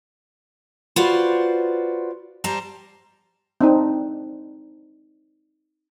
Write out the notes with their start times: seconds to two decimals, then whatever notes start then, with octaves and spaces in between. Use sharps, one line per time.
0.96 F4 F#4 B4 C5 D5
2.44 G3 C5 A5 A#5
3.61 C4 D4 D#4